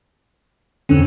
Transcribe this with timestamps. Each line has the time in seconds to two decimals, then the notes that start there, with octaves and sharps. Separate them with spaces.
0.89 F2 D3 C4 C#4